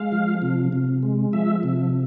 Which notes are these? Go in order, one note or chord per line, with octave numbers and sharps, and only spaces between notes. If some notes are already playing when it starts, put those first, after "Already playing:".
Already playing: G#3 F5
F3
C3
C3
G#3
F3 E5
C3